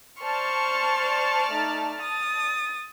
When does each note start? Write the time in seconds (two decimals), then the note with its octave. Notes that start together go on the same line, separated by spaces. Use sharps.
0.22 C5 D5 A5 C#6 F6
1.51 A3 D#4
2.01 D#6 A6